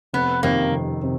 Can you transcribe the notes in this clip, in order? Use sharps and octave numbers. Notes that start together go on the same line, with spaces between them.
F1 B3
F2 C3 D#3 A#3
F1
C3